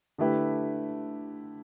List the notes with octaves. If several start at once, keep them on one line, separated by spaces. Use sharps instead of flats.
D3 A3 E4 G4 B4